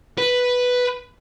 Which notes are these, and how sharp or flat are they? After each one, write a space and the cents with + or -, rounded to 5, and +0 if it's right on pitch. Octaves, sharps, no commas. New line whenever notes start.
B4 +0